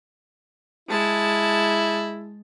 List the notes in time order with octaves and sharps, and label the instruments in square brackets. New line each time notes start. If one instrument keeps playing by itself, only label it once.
[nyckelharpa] G#3 A5 [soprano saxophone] E4